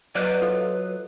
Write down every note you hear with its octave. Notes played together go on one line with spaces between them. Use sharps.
F#3 B4 D5 D#5 F#5
F4 A4 D#5